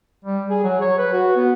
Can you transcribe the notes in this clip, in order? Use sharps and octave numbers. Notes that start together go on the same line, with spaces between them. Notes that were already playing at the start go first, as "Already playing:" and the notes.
G3
G#4
F#3
C#5
B4
F#4
B3